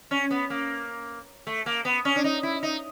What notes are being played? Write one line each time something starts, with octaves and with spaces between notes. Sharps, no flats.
C#4
B3
A#3
A3
A#3
B3
C#4
D4
D#4
E4
D#4